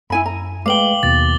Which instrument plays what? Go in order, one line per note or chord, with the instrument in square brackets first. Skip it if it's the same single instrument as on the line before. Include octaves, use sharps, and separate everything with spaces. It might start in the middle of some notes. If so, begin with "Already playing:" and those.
[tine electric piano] F#2 [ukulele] E4 G#5 B5
[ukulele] A#5
[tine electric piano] G#3 A3 B4 [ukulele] F5 G5 [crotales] D6 F#7 G7
[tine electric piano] D#2 B2 D#3 [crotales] A6